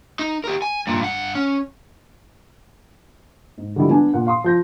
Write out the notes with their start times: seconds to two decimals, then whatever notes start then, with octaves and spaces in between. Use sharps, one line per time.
0.19 D#4
0.44 G4 A#4
0.62 G#5
0.87 G2 A#2
1.00 G2 F#5
1.35 C#4
3.58 G#2
3.76 D3 E3 F3 G3 G#3 E4
3.90 B3 D4 G#5
4.14 A#2 F#5
4.27 F5 C6 D#6
4.44 F3 G6 A#6